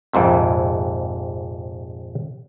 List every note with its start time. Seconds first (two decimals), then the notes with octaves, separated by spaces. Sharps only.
0.13 A#1 F2 G#2 C3